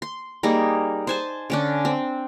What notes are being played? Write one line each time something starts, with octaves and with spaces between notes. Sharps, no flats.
C6
G3 A#3 D#4 G#4
C5 G#5 A5
D3 C#4 D4
C4